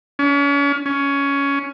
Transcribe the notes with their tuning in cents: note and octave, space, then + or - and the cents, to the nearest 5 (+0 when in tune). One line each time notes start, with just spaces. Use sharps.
C#4 +40
C#4 +15